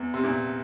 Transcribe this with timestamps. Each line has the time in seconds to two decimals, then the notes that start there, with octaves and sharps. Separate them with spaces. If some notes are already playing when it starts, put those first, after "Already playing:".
Already playing: E2
0.14 C3
0.24 E2 A#2